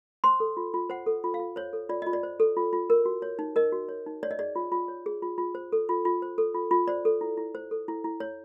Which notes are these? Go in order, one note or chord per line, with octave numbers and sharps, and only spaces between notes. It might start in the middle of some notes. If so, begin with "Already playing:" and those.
C5 C6
A4
F4
F4
C5 F#5
A4
F4
F5
F4
C5 C#5
A4
F4 D5
F4 D#5
D5
C5
A4
F4
F4
A#4
F#4
C#5
D#4
A#4 D#5
F#4
C#5
D#4
C#5 D5
D#5
G#4 D5
F4
F4
C#5
G#4
F4
F4
C5
A4
F4
F4
C5
A4
F4
F4
C5 D5
A4
E4
E4
C5
A4
E4
E4
C#5